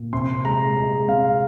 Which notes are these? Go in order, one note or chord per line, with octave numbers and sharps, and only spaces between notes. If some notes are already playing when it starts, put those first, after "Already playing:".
Already playing: A#2
C3 C6
G#3 A#5
G#3 A#5
C3 F5